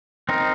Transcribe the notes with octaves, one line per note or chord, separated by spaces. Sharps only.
C4 D#4 A#4